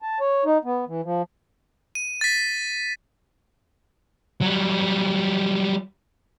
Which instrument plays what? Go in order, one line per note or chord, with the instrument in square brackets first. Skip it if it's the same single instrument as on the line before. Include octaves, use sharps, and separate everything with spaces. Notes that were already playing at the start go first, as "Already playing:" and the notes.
[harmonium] A5
C#5
D#4
B3
E3
F3
[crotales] D#7
A6 B6
[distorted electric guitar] F#3 G3